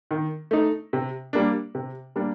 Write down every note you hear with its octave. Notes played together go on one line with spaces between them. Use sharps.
D#3
A3 D#4
C3
G3 A#3 D4
C3
G3 A#3 D4